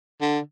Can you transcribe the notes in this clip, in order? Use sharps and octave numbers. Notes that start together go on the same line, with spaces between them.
D3